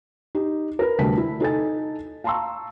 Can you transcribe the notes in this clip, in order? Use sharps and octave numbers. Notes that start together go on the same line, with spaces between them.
D#4 G4
A#4 B4
D2 C3 G3 A5 B6
E4
D#4 A4 G#5 A6
F5 A5 A#5 C6 C#6 E6